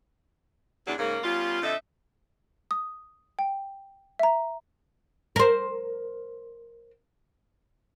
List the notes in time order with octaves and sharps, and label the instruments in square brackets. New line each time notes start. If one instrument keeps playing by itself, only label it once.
[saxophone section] E2 F#3 D4
G#2 C#3 A#3
G3 B3 C#4 F4
F2 D3 A3 A4 D#5 E5
[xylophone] D#6
G5
E5 A#5
[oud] A#4 C5